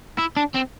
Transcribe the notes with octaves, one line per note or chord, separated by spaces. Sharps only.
E4
D4
C4